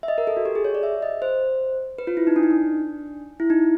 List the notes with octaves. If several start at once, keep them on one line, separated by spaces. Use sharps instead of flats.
E5
D#5
A#4
A4
F#4
G4
G#4
C#5
D5
E5
D#5
C5
B4
F4
E4
D#4
D4
D#4
D4
E4
D#4